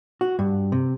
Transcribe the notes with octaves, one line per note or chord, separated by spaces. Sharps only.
F#4
G2
C3